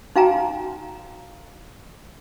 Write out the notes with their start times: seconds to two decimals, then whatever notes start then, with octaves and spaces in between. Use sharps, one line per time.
0.16 D#4 F#4 F5 G5 G#5 A#5